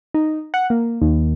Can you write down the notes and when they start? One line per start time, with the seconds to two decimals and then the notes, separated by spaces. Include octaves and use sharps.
0.14 D#4
0.54 F#5
0.70 A#3
1.02 D#2